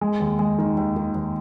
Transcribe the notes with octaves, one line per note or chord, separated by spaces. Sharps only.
G#3
D#2
G#3
D#3
D#2
D#3
D#2